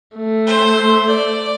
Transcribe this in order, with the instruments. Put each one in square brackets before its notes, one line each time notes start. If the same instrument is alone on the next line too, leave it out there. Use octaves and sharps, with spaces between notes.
[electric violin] A3
[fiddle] C5
D5